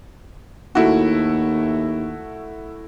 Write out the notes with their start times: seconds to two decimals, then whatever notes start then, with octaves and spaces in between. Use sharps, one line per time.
0.75 D#2 A3 E4 F#4